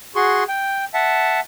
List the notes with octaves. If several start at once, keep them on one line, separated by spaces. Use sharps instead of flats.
F#4 G#4 C6 C#6
G5
E5 F#5 A5